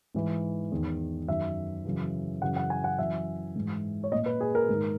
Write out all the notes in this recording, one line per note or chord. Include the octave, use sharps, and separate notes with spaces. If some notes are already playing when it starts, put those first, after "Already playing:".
G#2 E3
E2 D#3
F#2 D#3 E5
F#2 C#3 E3
F#2 C#3 E3 F#5
F#5
G#5
F#5
F#2 E3 E5
G#2 E3
C#5
A#2 D#5
B4
G#4
A#4
G#2 D#3